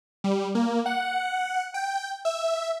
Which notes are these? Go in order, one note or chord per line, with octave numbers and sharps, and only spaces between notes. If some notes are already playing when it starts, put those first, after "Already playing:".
G3
A#3
F#5
G5
E5